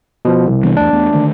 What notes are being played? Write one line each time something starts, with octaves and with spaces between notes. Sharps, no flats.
B2 F3
C2
E3 B3 D4
E2 A3 D4
E2 A3 B3
D3 D#3 A3